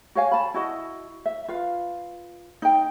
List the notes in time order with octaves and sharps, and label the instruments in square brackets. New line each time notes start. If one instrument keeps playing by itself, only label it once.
[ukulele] F#4 C#5 F5 G#5
A5 B5
E4 F#4 D#5
E5
F4 B4 F5
D#4 G5